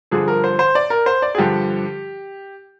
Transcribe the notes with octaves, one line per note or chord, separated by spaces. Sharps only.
G2 D3 F3 G#4
A#4
C5
C5
D5
A#4
C5
D5
G#4
G2 D3 F3 G4